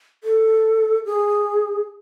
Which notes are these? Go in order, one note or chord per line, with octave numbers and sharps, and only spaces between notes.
A4
G#4